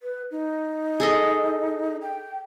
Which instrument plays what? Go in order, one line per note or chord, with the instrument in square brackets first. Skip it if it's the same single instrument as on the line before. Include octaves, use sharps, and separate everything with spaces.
[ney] B4
D#4
[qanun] G#4 A4 D#5
[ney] G5